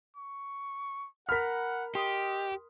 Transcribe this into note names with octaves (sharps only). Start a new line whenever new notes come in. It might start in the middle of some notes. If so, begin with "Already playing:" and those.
C#6
A#4 F#5 B5 F6 B6
G4 D#5 C6 D#6